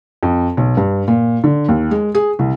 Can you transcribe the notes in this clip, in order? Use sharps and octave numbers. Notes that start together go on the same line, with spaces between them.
F2
B1
G2
A#2
D3
D#2
G#3
G#4
C2